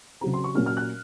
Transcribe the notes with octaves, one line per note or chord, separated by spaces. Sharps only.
C#3 F#3 C4 A#5
C6
C#6
A#2 F#3 A#3 C#4 F6
F6
F#6